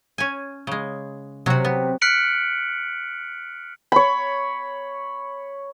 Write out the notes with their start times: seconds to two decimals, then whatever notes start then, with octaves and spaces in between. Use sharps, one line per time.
0.18 C#4 G#5
0.67 C#3 G#3
1.46 C3 F#3 F#4
1.65 B3
2.01 F6 F#6 B6 C#7 D7 F#7
3.92 C#5 B5